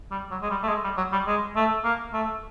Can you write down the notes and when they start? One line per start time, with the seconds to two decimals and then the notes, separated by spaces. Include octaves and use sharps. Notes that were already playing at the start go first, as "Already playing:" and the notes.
0.11 G3
0.31 F#3
0.42 G#3
0.50 G3
0.63 A3
0.68 G#3
0.84 G3
0.97 F#3
1.12 G3
1.27 G#3
1.56 A3
1.84 A#3
2.13 A3